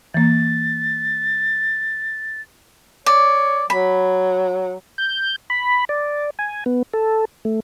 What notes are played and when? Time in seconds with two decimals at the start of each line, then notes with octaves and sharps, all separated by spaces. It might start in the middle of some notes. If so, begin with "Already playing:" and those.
0.14 E3 A#3 A6
3.06 C#5 D5
3.70 F#3 B5
4.98 G6
5.50 B5
5.89 D5
6.39 G#5
6.66 B3
6.93 A4
7.45 A3